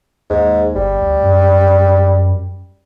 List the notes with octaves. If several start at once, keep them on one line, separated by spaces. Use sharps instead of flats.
D#2 G#2
G1 G3
D2
F#2